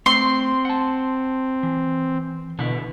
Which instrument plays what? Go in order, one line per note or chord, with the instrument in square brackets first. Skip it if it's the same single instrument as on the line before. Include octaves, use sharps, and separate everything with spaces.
[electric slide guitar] A3 [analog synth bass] C4 [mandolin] C6
[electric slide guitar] F#5 A5
E3
[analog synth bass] B2 [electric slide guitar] D3 E4